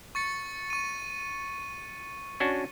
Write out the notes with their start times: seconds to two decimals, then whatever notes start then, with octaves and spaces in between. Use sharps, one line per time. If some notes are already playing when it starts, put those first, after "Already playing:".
0.15 C#6 A6 C#7
0.70 C#6 D#7
2.40 C#4 D4 F#4